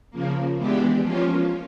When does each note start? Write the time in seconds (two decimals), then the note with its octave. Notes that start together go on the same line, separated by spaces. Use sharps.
0.10 C#3 F3 A#3
0.56 E3 G#3 B3 D4 G4
1.01 F3 A#3 C#4 F4